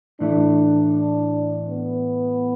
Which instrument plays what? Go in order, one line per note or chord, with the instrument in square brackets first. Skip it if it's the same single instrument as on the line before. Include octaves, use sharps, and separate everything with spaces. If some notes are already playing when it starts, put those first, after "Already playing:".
[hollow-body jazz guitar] A2 E3 A3 [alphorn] D4
[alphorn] B3